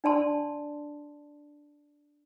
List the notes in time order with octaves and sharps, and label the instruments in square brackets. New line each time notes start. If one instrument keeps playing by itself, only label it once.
[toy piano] D4 D5 A5 C6